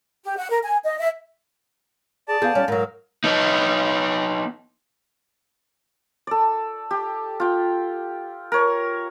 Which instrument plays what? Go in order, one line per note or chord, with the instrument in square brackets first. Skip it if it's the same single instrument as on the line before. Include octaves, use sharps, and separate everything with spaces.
[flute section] G4
F#5
A#4
G#5
D#5
E5
[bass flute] G#4 [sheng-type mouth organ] D5 A5
[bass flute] B3 [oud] G#4 [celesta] F5 G6
[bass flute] G3 [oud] C#4
[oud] G#2 F#3 [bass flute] A#4
[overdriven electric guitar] B3 D#4
[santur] A4 D5
G4
F4 G5
A#4 C#5